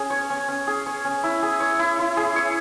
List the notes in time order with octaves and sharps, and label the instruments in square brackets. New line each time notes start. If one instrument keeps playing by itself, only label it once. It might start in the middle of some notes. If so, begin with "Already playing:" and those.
Already playing: [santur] C#4 G#4
C#5
C#4
C#4
G#4
C#5
C#4
E4
G#4
C#5
E4
E4
G#4
C#5